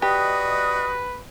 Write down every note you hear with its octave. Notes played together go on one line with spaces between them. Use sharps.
F#4 G4 B4 D5 D#5 D#6